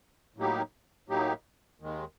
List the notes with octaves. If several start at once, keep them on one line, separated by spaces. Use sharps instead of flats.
A2 F#3 A#3 D#4 G4
A2 F#3 A#3 D#4 G4
D#2 D#3 G#3